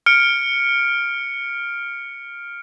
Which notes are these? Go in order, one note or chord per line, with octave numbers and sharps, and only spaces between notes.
F6 C#7 D7